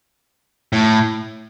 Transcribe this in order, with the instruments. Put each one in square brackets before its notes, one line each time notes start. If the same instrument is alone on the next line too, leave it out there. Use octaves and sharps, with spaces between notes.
[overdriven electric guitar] A2